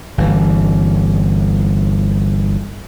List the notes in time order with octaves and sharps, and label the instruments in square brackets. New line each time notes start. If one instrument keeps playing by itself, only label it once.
[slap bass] G1 E3